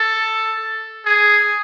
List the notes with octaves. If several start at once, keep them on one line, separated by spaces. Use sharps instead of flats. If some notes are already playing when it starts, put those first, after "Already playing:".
Already playing: A4
G#4